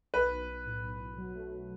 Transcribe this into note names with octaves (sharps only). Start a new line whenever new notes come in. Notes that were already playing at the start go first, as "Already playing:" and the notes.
B1 B4
B1
B1
A2
B1
B1
F#3
A3